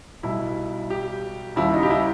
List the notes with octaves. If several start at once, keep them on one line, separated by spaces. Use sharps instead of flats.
B1 B2 G3 E4
G4
D#2 C#3 G3 E4
D#4
G4
E4